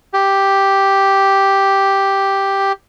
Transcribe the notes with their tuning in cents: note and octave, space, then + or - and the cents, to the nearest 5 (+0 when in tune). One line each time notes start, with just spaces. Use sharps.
G4 +0